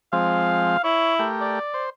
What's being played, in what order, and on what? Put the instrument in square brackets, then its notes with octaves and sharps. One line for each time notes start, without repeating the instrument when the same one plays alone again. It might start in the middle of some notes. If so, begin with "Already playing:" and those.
[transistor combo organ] F3 G#3 C4 [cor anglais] F5
[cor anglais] E4 [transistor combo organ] C#5
[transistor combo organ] A3 G4 A#4
[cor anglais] D5
[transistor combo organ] C5